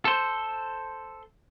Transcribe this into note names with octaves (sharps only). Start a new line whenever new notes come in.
A4 C5